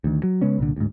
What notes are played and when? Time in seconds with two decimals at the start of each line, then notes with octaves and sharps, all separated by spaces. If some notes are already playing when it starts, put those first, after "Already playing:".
0.04 D2 D#3
0.23 F#3
0.41 C#3 G#3 B3 C#4
0.58 C2 A#2 D3
0.76 D2 G#2